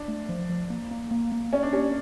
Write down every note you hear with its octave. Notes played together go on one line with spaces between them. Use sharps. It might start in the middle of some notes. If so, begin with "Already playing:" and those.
Already playing: D4
A3
F3
F3
A#3
A#3
A#3
A#3
C#4 D5
D4
C#4 G4